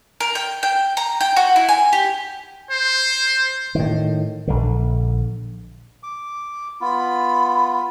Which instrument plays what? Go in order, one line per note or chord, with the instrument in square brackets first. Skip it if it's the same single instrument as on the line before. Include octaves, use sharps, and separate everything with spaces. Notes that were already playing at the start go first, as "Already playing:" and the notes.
[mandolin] A#4
G5
G5
A#5
G5
F#4
E4
G#5
G4
[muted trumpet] C5
[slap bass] A2 D#3
A#1 D3
[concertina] D6
[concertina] B3 F4 [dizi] B5